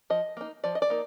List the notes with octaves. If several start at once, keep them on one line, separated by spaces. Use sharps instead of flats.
F3 D#5
A#3 D#4
F3 D5
D#5
D5
A#3 D#4